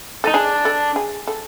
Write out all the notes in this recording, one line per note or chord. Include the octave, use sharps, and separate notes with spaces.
D#4 A4
D4 G#4
A4
G#4
A4